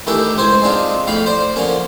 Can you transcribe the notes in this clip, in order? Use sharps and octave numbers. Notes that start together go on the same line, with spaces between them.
D#3 E3 A3 D4 E4 G4
C#2 C4 C5 G#5
G#3 C4 D4 D#4 F4
F2 A2 F5 G5 B5
C5 D5
D3 F3 A#3 C#4